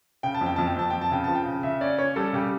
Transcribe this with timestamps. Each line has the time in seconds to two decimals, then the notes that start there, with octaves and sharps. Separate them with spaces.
0.23 C#3 G5
0.34 A5
0.41 F2
0.46 G5
0.56 F2 A5
0.67 G5
0.76 F2 A5
0.90 F2 G5
1.01 A5
1.11 C#3 G5
1.24 F3 A5
1.35 G5
1.46 C#3
1.63 C#3 E5
1.81 C#4 D5
1.98 C#4 C#5
2.16 G3 A4
2.33 C#3 G4